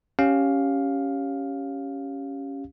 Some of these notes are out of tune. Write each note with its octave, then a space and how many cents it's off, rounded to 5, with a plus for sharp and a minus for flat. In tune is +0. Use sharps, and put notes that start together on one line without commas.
C#4 +0 G4 -5 F5 +10